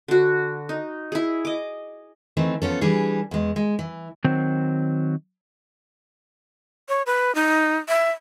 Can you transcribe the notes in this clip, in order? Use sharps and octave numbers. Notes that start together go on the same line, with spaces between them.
D3 F#4
D#4
E4 G#4
D#5 D6
D#3 E3 A3 C4
F3 B3 C#4 A4
E3 G3 D4 G#4
E2 G#3
G#3
E3
D#3 F#3 C4 C5
C#5
B4
D#4
E5